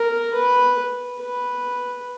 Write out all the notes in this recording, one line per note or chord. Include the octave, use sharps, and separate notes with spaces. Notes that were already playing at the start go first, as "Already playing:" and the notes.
Already playing: A#4
B4
B4